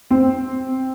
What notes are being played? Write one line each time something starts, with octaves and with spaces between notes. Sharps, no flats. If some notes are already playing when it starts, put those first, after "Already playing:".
C4